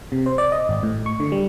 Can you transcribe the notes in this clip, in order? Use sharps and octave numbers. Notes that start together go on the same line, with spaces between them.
C3
C5
D5
D#5
G#1
A2
C#6
D3
G3